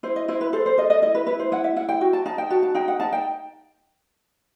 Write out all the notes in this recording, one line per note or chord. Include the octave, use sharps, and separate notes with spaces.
E4 C5
D#5
E4 C5
B4
A4 C5
C5
A4 D#5
D#5
E4 D#5
B4
E4 B4
C5
E4 F#5
E5
E4 F#5
G5
F#4 G5
A5
D#4 A5
G5
F#4 A5
A5
D#4 G5
F#5
D#4 A5
G5